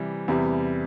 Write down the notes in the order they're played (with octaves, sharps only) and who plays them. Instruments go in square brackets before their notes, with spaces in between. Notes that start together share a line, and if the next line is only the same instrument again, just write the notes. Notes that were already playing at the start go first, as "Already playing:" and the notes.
Already playing: [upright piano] C3 E3 G3
E2 C3 G3